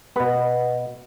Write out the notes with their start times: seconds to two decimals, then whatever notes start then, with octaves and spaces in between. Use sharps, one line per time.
0.16 B2 B3 B4 D#5